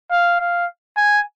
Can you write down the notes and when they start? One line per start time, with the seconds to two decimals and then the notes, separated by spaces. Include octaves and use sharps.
0.11 F5
0.40 F5
0.97 G#5